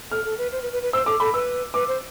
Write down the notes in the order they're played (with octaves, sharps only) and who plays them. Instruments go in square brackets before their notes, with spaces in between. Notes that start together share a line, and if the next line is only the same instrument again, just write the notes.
[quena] A4 [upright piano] F6
[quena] A4
B4
C5
B4
B4
B4
[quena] C5 [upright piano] E6
[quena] A4 [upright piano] D6
[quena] A4 [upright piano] B5
[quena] B4 [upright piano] E6
[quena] B4 [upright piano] D6
[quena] C5